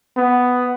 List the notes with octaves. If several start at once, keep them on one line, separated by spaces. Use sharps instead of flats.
B3